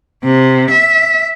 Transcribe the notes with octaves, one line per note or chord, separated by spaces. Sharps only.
C3
E5